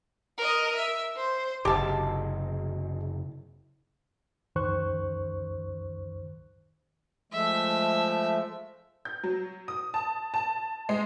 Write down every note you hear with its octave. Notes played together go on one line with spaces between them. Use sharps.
A#4 D#5
E5
C5
F#1 C3 G4 G#4 D#5 A5
C#2 F#2 D#3 C5 C#6 F#6
F3 G#3 A3 E5
G6
F#3
D#6
A5
A5
G#3